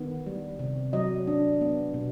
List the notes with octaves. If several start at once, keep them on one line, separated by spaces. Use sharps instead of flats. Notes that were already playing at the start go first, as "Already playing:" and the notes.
Already playing: D#3 B3
G3
C3
F#3 D#5
D4
B3
B2